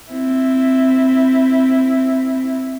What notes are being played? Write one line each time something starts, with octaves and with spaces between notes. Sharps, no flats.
C4 E4